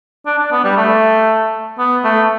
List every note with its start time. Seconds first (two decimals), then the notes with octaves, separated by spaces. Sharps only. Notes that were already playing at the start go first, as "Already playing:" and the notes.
0.26 D4
0.39 D4
0.52 B3
0.64 G3
0.77 A3
1.79 B3
2.04 A3